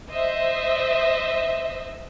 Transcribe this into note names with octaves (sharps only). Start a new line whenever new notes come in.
C5 D#5 E5